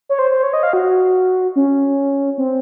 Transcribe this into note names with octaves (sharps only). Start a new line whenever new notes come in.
C#5
C5
C5
C#5
D#5
F5
F#4
C#4
C4